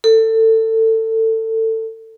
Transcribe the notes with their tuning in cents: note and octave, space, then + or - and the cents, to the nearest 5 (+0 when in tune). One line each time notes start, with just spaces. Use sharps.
A4 +25